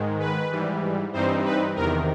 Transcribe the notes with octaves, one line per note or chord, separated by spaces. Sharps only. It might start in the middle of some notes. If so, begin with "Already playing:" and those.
Already playing: G#2 D#3 G#3
B4
G#2 E3 G3
G2 E3 G3 C4 D#4 C5
B4
E2 C3 D#3 A#4